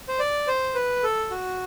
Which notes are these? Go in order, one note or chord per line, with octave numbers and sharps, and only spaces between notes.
C5
D5
C5
B4
A4
F#4